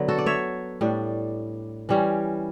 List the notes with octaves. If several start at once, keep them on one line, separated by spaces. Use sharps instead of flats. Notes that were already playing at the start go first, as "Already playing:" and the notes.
Already playing: D3 F#3 B3
F#4 A4
D5
C#5 E5
A2 G3 D4
E3 G3 C#4